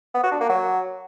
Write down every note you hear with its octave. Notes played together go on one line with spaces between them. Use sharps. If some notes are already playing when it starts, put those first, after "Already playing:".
B3
F#4
D4
A#3
F#3